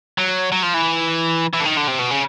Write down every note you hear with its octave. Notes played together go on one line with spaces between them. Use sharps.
F#3
F#3
F3
E3
E3
D3
D#3
D3
C3
B2
C#3